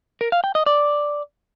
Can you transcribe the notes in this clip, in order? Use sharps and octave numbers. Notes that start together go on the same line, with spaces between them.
A#4
F5
G5
D#5
D5